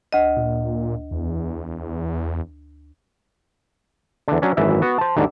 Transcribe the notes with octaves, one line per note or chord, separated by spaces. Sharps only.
D2 D#5
A#2
E2
E2 D3
F#3 C#4 D4
G#1 F#2 E3 E5
B3 F#4
C5 A5
D#2 G#2 D3